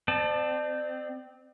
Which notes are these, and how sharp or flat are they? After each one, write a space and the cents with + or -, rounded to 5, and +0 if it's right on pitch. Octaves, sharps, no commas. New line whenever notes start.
C4 -20 D5 +35 A5 +0